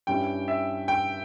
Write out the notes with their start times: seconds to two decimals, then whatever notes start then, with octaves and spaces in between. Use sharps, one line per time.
0.07 G2 G3 C#4 E4 G5
0.48 E5
0.88 G5